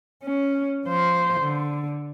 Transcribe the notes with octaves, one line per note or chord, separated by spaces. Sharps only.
C#4
F3 C5
D3